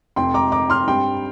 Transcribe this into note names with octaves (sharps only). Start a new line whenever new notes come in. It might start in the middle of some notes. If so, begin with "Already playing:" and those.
F1 F2 C3 G5 C6
A#5 D6
A#5 D6
C6 F6
G2 G3 C4 G5 C6